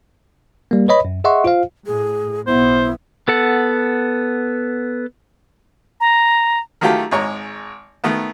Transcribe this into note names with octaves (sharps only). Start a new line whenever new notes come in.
G3 A#3
B4 C#5 D#5 B5
F#2
G#4 D#5 E5 F#5 C6 C#6
F4 C5 F5
A2 G#4
B1 B3 E4 C5
B3 A4 F#5
A#5
D#3 F#3 A3 F4 G4 A4
G#1 G#3 C#5 A#5
D#3 A3 B3